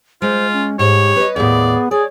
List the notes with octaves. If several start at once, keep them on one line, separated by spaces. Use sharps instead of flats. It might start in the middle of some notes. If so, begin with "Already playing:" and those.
G#3 F4 C5
C#4
G#2 G4 C#5
B4 D#5
D#2 A2 B3 G#4 D5
G#4 C#5 D5